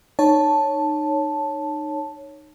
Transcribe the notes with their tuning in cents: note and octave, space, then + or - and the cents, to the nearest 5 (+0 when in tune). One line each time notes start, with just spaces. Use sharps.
D#4 -25 C#5 +0 A5 +0